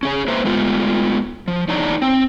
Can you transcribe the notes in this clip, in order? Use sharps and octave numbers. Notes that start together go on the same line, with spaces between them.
C#4 G#4 C#5
A#3 B4 C5 E5 A#5
G#3 A3 B3 F4
F3
E2 D4 D#4 C#5 A#5
C4